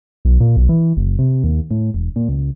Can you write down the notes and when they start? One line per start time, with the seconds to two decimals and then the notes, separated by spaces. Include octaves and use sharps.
0.25 B1
0.40 A#2
0.57 B1
0.69 E3
0.97 F#1
1.19 C3
1.44 D#2
1.71 A2
1.94 E1
2.16 A#2
2.29 C#2